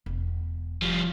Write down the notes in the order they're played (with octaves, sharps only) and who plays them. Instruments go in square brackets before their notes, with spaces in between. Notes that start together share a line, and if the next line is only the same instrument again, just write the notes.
[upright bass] E1
[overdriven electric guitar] F3 G3